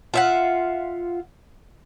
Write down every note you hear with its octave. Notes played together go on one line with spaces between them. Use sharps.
F4 E5 F#5